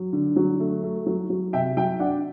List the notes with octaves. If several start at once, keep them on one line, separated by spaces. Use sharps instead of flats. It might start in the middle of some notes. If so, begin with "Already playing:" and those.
Already playing: F#3
D3
F#3
A3
A3
F#3
F#3
C3 E5 G5
F#3 E5 G5
D4 D5 F#5